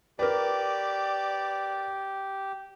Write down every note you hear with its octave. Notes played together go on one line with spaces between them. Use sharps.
G4 A#4 B4 D5